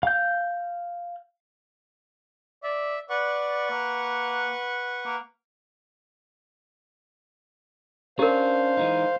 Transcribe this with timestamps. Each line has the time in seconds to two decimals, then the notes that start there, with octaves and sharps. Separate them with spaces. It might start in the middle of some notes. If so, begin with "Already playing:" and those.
0.03 F5 G6
2.63 D5 E5
3.10 B4 D5 F#5 C#6
3.71 A#3
5.05 A#3
8.19 C#4 D4 G4 A#4 C5 F5
8.77 E3 G#3 D#4